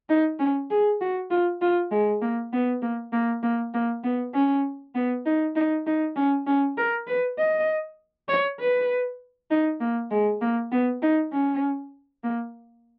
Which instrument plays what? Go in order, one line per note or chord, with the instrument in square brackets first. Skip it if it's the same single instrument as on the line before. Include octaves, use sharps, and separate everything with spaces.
[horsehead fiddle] D#4
C#4
G#4
F#4
F4
F4
G#3
A#3
B3
A#3
A#3
A#3
A#3
B3
C#4
B3
D#4
D#4
D#4
C#4
C#4
A#4
B4
D#5
C#5
B4
D#4
A#3
G#3
A#3
B3
D#4
C#4
A#3